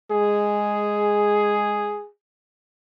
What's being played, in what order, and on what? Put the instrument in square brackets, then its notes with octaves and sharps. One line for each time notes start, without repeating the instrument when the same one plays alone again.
[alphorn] G#3 [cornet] G#4